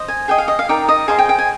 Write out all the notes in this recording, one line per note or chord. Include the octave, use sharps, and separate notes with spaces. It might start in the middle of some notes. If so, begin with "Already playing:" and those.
Already playing: C5 D#5
G#5
G#4 D#5 G5
F5
D#5
F5
D#4 A#4 D5 G5
D#5
G#4 C5 D#5 F5
G5
G5
G#5